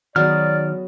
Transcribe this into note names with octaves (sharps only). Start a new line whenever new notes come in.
D#3 F#3 B3 G#4 D5 F6